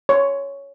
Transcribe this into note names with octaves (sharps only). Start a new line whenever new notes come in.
C#5